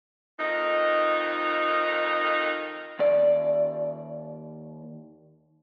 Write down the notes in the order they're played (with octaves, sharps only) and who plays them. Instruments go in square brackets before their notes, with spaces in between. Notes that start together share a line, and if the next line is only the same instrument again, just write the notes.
[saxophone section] F2 D#3 D#4
[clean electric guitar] D#2 D5